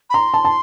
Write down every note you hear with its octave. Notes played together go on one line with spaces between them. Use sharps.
B5
A#5 C6
A5
A5